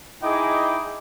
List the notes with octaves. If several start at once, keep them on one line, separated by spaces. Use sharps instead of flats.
D#4 E4 G#4 D#5 G5 D6